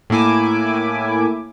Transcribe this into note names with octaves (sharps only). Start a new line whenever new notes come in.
A2 A#3 E4 G#5 D6